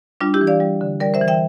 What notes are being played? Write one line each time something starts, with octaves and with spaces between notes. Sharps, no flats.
G3 D4 F4
E4 G4
E3
D5 F5
G3
D3
G3 A#4 D5
C5 E5
E3
E5 G5